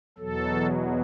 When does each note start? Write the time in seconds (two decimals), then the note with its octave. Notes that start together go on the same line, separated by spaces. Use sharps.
0.18 E2 B2 F#3 A4